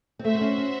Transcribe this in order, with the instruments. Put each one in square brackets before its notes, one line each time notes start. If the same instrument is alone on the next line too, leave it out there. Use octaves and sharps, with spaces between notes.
[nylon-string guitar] C4
[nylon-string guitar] A3 [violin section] F#4 C5 E5
[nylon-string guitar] C4
C#4
C#4